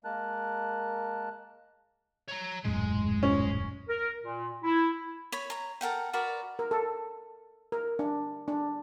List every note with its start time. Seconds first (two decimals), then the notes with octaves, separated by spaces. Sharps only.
0.05 G#3 A#3 A#4 A5 F#6
2.29 C#5 A#5
2.64 D#1 F#2 A2 G#3
3.23 C#4
3.89 A#4
4.23 A#2
4.64 E4
5.32 C#5 B5
5.50 C#5 A#5
5.81 A4 A#4 F#5 G5
6.13 F#4 A#4 B4 D5
6.59 A#4
6.71 A4
7.72 A#4
7.99 D4
8.48 D4